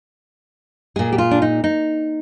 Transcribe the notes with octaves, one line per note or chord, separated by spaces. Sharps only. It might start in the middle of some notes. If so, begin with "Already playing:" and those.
A#2 G#3 G#4
G4
F4
D4
D#4
D#4